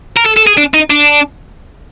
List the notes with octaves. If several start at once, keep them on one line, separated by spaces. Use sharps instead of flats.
A#4
A4
A4
G#4
D4
D#4
D4